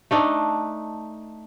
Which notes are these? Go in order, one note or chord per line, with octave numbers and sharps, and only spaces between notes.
A3 D4 D#4